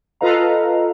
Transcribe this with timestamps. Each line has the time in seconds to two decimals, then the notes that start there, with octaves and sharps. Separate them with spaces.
0.21 F4 A4 B4 D#5 F5 A#5